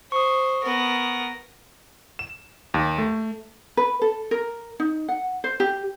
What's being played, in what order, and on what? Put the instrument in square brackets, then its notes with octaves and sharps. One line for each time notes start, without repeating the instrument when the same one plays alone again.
[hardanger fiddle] C5 [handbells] C#6 D#6
[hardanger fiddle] B3 A#4
[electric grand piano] E7
D#2
A3
[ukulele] B4
A4
A#4
D#4
F#5
C5
G4